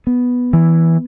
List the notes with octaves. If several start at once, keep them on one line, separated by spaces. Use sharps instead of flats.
B3
E3